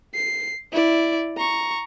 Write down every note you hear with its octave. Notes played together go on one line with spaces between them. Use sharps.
C7
E4 D5
A#5 C#6